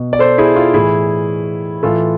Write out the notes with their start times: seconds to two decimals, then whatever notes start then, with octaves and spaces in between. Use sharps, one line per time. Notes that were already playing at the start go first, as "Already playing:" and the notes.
Already playing: B2
0.13 D5
0.19 A4 C5
0.38 E4 G#4
0.56 F4
0.74 A2 E3 E4 G#4
1.83 A2 E3 F4 A4